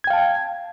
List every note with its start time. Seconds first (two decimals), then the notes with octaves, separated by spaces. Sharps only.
0.04 G#6
0.07 G5
0.10 F5
0.13 A5